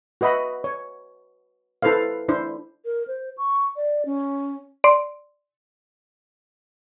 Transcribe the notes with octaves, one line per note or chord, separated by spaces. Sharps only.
F#4 B4 D#5 E5 B5
C#5
E4 A4 B4 C5 F5
D4 E4 C5
A#4
C5
C#6
D5
C#4
D5 C6